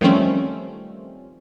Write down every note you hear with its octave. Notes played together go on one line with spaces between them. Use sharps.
D#3 F3 G3 A3 C4 C#4